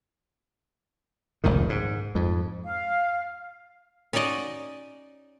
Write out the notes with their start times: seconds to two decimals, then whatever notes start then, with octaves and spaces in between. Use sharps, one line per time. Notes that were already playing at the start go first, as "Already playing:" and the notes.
1.44 F1 C#2 A#2 D#3
1.69 G#2
2.15 F2 G#2
2.65 F5
4.13 C#4 D#4 F#4 D5 D#5